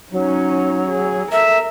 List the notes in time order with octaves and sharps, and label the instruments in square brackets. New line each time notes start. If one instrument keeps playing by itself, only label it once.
[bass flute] F#3 [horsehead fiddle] C#4 D#4
[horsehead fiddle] G#4
[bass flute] A4 [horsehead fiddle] A#4 [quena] E5